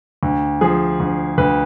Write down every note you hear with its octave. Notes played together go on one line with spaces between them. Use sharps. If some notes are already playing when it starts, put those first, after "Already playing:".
D2
F3 G#4
D2
D2 B4